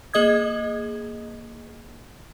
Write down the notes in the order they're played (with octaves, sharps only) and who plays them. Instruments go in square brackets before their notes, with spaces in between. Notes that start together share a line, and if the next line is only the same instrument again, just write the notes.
[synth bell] A#3 G#4 D#5 D#6 G#6